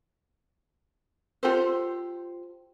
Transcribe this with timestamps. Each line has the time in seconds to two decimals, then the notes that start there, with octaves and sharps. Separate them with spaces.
1.43 F4 G4 A4 C5